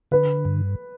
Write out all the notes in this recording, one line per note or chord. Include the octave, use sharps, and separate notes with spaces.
D3 B4
G2